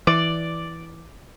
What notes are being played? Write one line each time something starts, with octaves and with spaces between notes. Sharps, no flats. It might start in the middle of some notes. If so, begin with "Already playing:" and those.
E3 D5